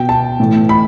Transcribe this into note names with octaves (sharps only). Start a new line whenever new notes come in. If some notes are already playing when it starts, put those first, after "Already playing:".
Already playing: B2 G5
A5
A2 E3
B5